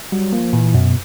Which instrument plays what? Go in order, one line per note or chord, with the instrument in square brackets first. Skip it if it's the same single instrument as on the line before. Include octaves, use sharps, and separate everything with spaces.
[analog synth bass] F#3 [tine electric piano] G3
[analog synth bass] F3 [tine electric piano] A#3
[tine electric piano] A#2 [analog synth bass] E3
[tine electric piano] F#2 [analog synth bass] B2